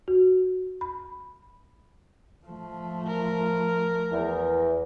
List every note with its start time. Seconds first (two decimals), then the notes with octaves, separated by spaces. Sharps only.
0.08 F#4
0.81 B5
2.46 F3 A3
3.07 A#4
4.12 E2